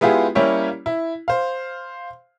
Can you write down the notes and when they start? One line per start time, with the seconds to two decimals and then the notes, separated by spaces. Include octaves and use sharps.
0.01 G#3 B3 E4 F4 G4 G#4
0.35 G3 A#3 C#4 E4 G4 C#5
0.86 E4
1.28 C5 F5